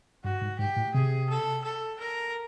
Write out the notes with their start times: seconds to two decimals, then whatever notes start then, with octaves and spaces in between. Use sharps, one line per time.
0.24 G2 F#4
0.42 G#2
0.59 G#2 G4
0.77 A2
0.94 C3 G#4
1.29 A4
1.64 A4
2.00 A#4